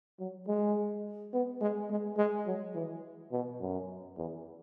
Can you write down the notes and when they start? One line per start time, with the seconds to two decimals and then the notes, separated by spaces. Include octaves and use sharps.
0.19 F#3
0.48 G#3
1.33 B3
1.61 G#3
1.90 G#3
2.17 G#3
2.46 F#3
2.75 E3
3.32 B2
3.60 F#2
4.17 E2